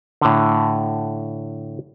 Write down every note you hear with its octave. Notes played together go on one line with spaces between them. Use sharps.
A2 D3